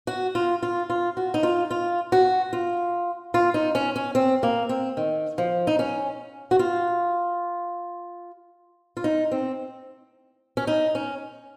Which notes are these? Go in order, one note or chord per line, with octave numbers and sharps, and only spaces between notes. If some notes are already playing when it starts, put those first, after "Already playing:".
F#4
F4
F4
F4
F#4
D#4
F4
F4
F#4
F4
F4
D#4
C#4
C#4
C4
A#3
C4
D#3
F3
D#4
C#4
F#4
F4
F4
D#4
C4
C#4
D#4
C#4